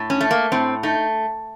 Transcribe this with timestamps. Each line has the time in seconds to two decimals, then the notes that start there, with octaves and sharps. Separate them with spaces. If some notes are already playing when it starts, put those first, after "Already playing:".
Already playing: A2
0.10 C#4
0.21 A3
0.31 A#3
0.52 A2 C4
0.83 A3 D#4